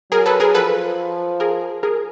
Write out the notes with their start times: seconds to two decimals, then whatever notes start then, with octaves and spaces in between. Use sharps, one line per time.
0.12 F#3 G#4 A#4
0.26 A4 B4
0.40 G#4 A#4
0.54 F3 A4 B4
1.40 G#4 A#4
1.83 G#4 A#4